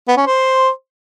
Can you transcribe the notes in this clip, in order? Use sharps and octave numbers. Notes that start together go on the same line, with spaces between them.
B3
C#4
C5